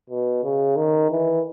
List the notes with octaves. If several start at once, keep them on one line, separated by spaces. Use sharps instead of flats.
B2
C#3
D#3
E3